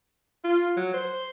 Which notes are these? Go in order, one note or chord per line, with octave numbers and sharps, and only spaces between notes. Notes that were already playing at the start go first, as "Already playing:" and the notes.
F4
F#3
C5